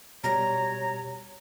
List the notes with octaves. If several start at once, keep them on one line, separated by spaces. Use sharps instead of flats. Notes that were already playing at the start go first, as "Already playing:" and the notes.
B2 G3 G4 C#5 A#5